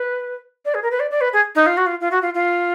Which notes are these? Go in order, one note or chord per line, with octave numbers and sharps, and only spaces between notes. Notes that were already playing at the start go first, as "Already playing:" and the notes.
Already playing: B4
D5
G#4
A#4
B4
D5
D5
B4
G#4
D#4
F4
F#4
F4
F4
F#4
F4
F4